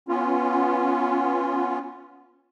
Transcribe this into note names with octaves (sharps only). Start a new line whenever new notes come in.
B3 C#4 F4